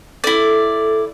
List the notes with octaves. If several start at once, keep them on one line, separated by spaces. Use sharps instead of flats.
E4 A4 D5